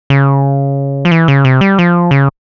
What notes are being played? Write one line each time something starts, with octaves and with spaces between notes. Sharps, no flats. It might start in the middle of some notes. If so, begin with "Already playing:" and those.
C#3
F3
E3
C#3
C3
G3
F3
C#3